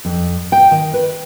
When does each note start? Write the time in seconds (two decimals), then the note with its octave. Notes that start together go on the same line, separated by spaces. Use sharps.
0.05 F2
0.52 G5
0.71 D#3
0.93 B4